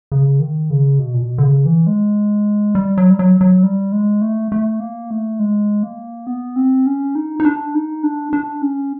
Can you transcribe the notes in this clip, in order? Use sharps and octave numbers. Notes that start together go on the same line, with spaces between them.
C#3
D#3
C#3
B2
A#2
B2
D3
C#3
E3
G#3
G3
F#3
G3
F#3
F#3
G3
G#3
A3
A3
A#3
A3
G#3
A#3
B3
C4
C#4
D#4
D#4
D4
D#4
D4
D4
C#4